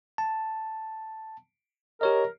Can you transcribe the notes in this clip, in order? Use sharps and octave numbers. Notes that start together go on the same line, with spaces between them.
A5
G4 A#4 C#5 D#5